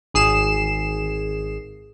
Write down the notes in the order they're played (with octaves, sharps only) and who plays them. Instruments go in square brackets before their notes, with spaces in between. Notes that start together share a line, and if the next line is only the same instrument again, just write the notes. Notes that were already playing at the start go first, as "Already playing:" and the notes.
[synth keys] G#1 G#4 C7 E7